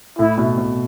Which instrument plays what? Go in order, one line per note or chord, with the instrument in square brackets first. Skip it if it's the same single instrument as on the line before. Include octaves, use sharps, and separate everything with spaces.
[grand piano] A2 [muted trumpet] E4
[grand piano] B2
B2